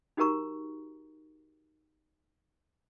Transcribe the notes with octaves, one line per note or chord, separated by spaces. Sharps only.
D#4 F#4 G4 A#4 A#5 C#6